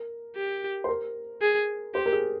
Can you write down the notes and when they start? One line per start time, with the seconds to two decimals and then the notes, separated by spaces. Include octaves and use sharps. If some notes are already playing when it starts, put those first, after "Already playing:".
Already playing: A#4
0.35 G4
0.84 C5
0.89 A#4
1.42 G#4
1.94 G4 C5
2.06 A#4
2.13 G#4